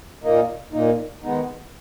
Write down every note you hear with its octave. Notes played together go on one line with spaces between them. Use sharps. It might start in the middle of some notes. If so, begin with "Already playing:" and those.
A#2 A#3 D#4
A#2 A#3 D#4
D#3 G#3 B3 D#4